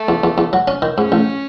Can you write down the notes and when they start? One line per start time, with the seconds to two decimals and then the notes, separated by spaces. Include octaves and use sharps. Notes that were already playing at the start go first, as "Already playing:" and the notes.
Already playing: A3
0.09 E2
0.24 E2
0.38 E2
0.53 F#3
0.68 C#4
0.82 D#3
0.97 G#2 C#4
1.12 A1